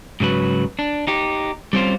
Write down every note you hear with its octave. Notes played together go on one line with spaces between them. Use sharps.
G#2 C#3 F#3 B4
D4
D#4 G4
G3 C4 C#4 F4 C5